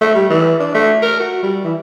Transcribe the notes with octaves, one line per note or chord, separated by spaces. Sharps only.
A3
G3
E3
D4
A3
A#4
F#4
G3
E3